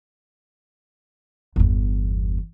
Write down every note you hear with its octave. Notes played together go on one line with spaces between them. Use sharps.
G1 E2